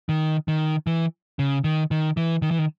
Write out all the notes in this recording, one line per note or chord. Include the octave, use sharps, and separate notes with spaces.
D#3
D#3
E3
C#3
D#3
D#3
E3
D#3
E3
D#3